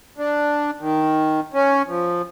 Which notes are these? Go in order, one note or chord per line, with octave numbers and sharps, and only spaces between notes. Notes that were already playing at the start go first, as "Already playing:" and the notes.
D4
D#3
C#4
F3